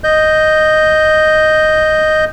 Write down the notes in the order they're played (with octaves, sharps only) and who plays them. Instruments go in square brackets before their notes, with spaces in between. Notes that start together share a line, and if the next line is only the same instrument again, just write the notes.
[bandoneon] D#5 G6